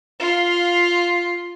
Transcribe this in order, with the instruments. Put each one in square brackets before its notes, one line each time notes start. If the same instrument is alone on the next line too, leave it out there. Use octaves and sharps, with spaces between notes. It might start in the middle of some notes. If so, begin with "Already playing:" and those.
[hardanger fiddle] F4 F5